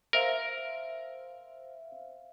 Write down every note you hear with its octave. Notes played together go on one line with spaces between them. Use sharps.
A#4 C5 E5 F5